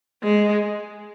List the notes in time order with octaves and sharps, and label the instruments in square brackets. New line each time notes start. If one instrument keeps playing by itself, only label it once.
[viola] G#3